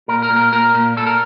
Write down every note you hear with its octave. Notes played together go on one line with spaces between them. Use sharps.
A#2 A#4
A#4
A#2
A#4
A#2 A#4
A#2
A#2 A4
A#4